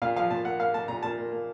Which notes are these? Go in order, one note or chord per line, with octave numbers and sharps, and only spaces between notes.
A#2 F5
F3 F5
A#2 A5
A#3 F#5
A#3 F5
A#3 A5
A#2 A#5
A#2 A5
A#3
A#3